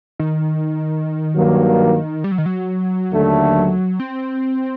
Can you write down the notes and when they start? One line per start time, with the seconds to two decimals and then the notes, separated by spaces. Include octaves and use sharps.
0.19 D#3
1.36 G2 F#3 A#3
2.24 G3
2.32 F#3
2.38 D#3
2.46 F#3
3.12 D#2 D3 A3
4.00 C4